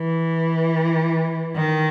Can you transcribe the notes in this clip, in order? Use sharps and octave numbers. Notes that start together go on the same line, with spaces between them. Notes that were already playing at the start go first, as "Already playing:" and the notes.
Already playing: E3
D#3